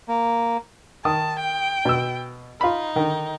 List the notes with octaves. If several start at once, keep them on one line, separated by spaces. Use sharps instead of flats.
A#3
D#3 A5 D#6
G5
B2 E6
D#4 F4 B5
D3 D#3